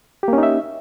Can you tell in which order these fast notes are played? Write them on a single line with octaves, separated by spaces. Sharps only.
G4 A#3 C#4 D#4 E5